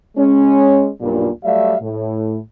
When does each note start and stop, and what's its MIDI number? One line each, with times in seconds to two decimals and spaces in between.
0.16 0.89 56
0.16 0.89 61
1.00 1.28 35
1.00 1.28 43
1.00 1.28 46
1.43 1.74 54
1.43 1.74 55
1.43 1.74 57
1.43 1.74 74
1.43 1.74 76
1.43 1.74 77
1.82 2.38 45